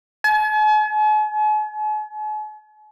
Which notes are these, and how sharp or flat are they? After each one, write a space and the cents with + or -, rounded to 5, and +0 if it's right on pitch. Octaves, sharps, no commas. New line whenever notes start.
G#5 +45